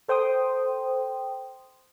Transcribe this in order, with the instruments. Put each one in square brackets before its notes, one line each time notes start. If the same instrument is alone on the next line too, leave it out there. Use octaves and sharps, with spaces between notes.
[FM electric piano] A4 C5 G5 C6 D#6